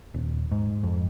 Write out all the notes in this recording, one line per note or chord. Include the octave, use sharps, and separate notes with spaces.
D#1
G#2
F2